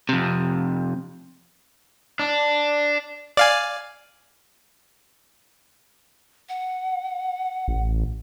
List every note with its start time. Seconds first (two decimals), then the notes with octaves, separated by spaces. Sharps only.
0.09 F2 C3
2.19 D4
3.37 D5 F5 G#5
6.49 F#5
7.68 A1